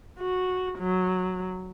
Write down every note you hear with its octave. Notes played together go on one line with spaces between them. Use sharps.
F#4
F#3